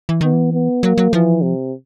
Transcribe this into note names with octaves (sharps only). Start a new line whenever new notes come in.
E3
D#3 B3
E3
B3
F#3 A#3
F#3
E3 F3
C3